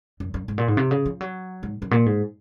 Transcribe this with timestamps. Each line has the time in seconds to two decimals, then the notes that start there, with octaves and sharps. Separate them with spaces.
0.20 F#2
0.34 F#2
0.48 G#2
0.58 A#2
0.68 G#2
0.77 C3
0.91 C#3
1.06 F3
1.21 F#3
1.63 G#2
1.82 F#2
1.91 A#2
2.06 G#2